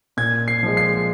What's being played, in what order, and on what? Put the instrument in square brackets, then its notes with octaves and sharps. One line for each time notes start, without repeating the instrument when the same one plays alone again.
[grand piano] A#2 G#6
C7
F3 G#3
C7